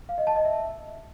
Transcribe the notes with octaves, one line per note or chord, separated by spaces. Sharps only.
F5
D#5
A5
D#5
E5